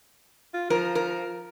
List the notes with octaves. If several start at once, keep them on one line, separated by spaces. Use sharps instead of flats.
F4
F3 A#4
A#4